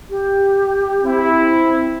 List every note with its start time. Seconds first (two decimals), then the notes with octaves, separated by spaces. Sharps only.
0.10 G4
1.04 C4 E4